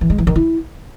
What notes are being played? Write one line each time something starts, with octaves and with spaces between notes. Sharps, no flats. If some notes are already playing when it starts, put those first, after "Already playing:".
E3
G#3
E3
D#3
E4